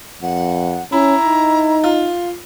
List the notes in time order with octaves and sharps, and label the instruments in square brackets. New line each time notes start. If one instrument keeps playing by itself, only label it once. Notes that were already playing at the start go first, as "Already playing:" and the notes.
[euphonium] F2 [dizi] F#5
[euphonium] C#4 [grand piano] E4 [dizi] A#5
[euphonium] D#4
[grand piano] F4